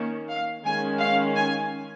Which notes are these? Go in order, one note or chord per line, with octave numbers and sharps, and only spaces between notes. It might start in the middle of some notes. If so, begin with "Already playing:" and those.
Already playing: D#3 A#3 C#4
F5
D#3 G#3 C#4 G#5
F5
G#5